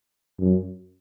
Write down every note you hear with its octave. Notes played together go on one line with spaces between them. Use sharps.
F#2